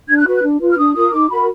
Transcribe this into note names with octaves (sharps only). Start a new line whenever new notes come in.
D4 G#6
F#6
F#4 B4
F#6
D4
F4 B4
F6
D4 D#6
F4 A#4 D#6
D#4 D6
F#4 A#4 B5